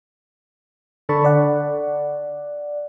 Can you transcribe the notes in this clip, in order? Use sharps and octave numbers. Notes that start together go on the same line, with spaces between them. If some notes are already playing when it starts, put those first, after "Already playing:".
D3 D4 A4 A5 B5 C#6
D5 F#5